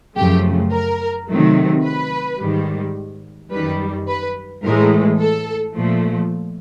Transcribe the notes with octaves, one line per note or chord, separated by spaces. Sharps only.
F#2 C#3 F3 A3 G4
A#4
C3 D#3 F#3 A3
B4
G#2 D#3 G3
F#2 D#3 G3 B4
B4
A2 E3 G#3 A#4
A4
A#2 F3 A3